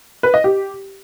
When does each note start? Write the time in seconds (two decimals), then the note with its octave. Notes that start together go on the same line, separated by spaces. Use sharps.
0.23 B4
0.34 D#5
0.44 G4